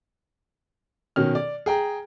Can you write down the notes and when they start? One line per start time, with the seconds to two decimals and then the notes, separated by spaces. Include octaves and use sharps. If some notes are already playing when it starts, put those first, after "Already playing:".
1.16 B2 D#3 C#4 F6
1.35 D5
1.66 G#4 G5 A#5